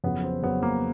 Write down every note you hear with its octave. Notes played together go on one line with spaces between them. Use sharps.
F2 C#3 F#3 B3
C4
F2 C#3 F#3 B3
A#3